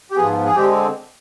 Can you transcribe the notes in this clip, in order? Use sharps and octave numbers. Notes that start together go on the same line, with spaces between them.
G4
G#2 F3 B3 G#4
G#4
D3 G#3 C4 G4